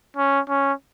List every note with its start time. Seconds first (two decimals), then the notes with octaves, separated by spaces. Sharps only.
0.17 C#4
0.49 C#4